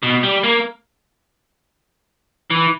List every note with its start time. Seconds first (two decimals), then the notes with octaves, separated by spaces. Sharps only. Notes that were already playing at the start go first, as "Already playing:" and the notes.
0.03 B2
0.23 G3
0.43 A#3
2.50 E3